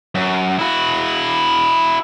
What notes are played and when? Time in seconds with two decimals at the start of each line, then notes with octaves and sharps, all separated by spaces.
0.15 F#2
0.59 E4 F#4